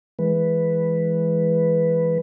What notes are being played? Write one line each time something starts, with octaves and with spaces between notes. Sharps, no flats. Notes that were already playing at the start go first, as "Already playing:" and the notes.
E3 G#3 B4